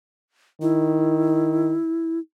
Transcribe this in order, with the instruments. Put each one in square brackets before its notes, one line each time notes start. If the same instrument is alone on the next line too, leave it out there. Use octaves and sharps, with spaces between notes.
[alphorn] D#3 [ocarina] E4